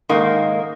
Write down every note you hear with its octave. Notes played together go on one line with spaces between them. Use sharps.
G#2 D#3 A#3